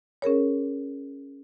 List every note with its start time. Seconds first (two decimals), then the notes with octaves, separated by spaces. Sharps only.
0.22 C#4 G#4 A#4 C#5